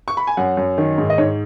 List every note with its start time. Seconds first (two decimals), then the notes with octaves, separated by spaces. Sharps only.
0.08 C#6
0.17 B5
0.27 G#5
0.37 F#2 F#5
0.57 F#2
0.78 D#3
0.98 G#2
1.10 D#5
1.18 G#2 C#5